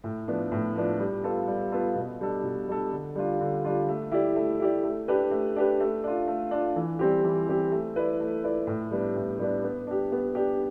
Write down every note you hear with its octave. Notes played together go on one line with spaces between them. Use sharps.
A2
F3 B3 D4
A2
F3 B3 D4
G3
B3 F4 A4
G3
B3 F4 A4
B2
G3 D4 A4
B2
G3 D4 A4
D3
G3 D4 F4
D3
G3 D4 F4
A3
E4 G4 D5
A3
E4 G4 D5
A3
D4 G4 B4
A3
D4 G4 B4
A3
D4 F4
A3
D4 F4
E3
G3 C4 G4
E3
G3 C4 G4
A3
E4 B4 D5
A3
E4 B4 D5
A2
G3 B3 D4
A2
G3 B3 D4
B3
D4 G4
B3
D4 G4